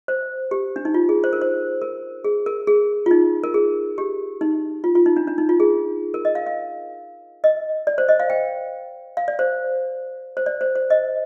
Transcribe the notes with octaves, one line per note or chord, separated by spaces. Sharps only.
C5
G4
D4
D#4
F4
G#4
C5
A#4
C5
A#4
G#4
A#4
G#4
F4
D#4
A#4
G#4
G4
D#4
F4
F4
D#4
D4
D4
D#4
F4
G#4
A#4
D#5
F5
F5
D#5
D5
C5
D#5
F5
G5
F5
D5
C5
C5
D5
C5
C5
D#5